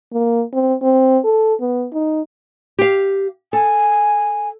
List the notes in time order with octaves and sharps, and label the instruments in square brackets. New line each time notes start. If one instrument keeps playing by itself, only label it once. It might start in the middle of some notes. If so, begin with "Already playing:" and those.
[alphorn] A#3
C4
C4
A4
B3
D#4
[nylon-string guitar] G4 F5
[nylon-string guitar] A4 [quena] G#5